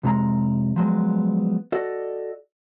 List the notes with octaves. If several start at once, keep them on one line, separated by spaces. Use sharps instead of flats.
C2 F2 C3 G#3 A#5
F3 F#3 G#3 B3
F#4 A4 D5 D#5